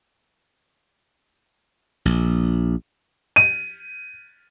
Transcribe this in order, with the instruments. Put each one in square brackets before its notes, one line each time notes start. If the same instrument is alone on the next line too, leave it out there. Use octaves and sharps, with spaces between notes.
[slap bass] A#1
[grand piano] D#7